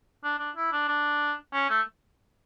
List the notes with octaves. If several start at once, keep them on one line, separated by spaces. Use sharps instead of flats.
D4
D4
E4
D4
D4
C#4
A3